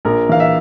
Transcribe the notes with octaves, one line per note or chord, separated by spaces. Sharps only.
A#1 A#4
E3 F5
E5